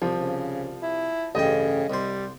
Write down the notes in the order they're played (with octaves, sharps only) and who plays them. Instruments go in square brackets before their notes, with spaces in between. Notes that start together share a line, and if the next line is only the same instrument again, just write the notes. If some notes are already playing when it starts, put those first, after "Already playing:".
[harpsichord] C2 [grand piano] F3
[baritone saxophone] C#3
E4
[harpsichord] A1 G2 G5 [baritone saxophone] C#3 [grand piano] D#5
[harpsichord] C2 C5 [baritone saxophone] G3